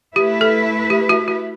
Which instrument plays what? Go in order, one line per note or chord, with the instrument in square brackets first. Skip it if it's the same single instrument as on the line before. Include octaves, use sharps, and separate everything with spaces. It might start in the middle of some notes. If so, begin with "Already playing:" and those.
[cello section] A3 E4 B4 E5 [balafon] G4
[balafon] A4
G4
F#4
F#4